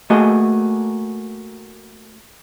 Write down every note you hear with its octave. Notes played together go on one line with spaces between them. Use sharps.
A3 A#3 F#4 G#4 D#5